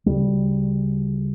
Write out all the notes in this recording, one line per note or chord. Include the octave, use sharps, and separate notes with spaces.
D2 C#3 G3